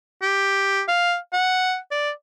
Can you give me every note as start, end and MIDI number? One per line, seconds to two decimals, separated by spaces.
0.22 0.82 67
0.88 1.17 77
1.33 1.77 78
1.91 2.10 74